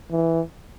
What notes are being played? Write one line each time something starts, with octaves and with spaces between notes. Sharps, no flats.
E3